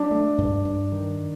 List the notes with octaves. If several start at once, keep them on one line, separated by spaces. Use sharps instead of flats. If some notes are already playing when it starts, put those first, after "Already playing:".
Already playing: F#3 D4
A3
G2
G2
D#3